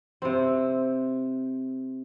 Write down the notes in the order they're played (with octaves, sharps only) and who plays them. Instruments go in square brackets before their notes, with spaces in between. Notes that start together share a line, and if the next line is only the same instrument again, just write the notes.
[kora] C3 C4